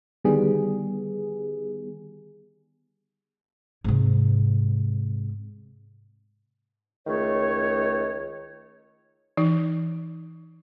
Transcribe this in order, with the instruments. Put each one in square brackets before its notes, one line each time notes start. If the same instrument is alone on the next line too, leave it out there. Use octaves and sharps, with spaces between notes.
[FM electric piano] D3 D#3 G3 B3 G#4
[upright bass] G#2 C3
[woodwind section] C#2 D#3 A3 C#5
[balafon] E3 D#4